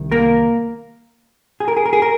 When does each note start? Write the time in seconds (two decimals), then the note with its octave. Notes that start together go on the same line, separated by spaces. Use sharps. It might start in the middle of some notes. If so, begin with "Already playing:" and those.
Already playing: C2 C3 D#3
0.11 A#3 A#4
1.60 G#4
1.68 A#4
1.77 G#4
1.86 A#4
1.93 G#4
2.02 A#4